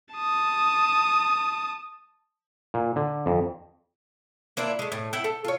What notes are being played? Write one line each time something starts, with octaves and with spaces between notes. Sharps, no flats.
A5 D#6
A#2
D3
F2
A#3 D4 E4 F4
G#3 A3
A2
E4 E5 F#5 G5
A4
F4 C#5